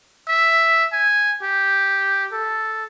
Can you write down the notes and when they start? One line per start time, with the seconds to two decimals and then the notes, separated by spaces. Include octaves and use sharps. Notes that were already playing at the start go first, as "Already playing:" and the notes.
0.28 E5
0.93 G#5
1.43 G4
2.32 A4